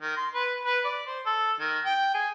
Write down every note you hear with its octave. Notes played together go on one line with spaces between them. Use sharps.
D#3
C6
B4
B4
D5
C5
A4
D#3
G5
G#4